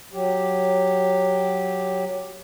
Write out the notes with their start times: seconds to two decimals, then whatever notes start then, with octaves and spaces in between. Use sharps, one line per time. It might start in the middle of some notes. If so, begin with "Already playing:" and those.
0.13 F#3 G4